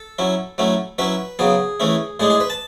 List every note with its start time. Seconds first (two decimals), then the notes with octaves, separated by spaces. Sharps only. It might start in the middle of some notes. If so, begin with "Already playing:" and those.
Already playing: A4
0.19 F#3 C#4 E4
0.58 F#3 A3 C#4 E4
0.98 F#3 C#4 E4 B4
1.39 C#3 F#3 B3 G#4
1.80 E3 A3 C#4 E4
2.20 A2 G#3 D4 G#4
2.30 G#4
2.40 B4
2.50 A5